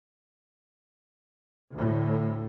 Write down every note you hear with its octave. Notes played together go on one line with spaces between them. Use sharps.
D2 A2